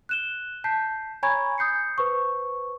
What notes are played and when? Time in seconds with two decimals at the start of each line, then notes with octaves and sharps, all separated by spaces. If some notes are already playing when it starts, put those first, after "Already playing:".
0.09 F#6 E7 G7
0.64 A5 G6 B6 C7
1.23 C#5 G#5 A#5 B5 C#6 G#6
1.58 D#6 G6 C7 C#7
1.98 B4 C5 C#6